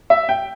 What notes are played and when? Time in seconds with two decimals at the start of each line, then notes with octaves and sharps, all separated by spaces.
0.10 E5
0.29 G5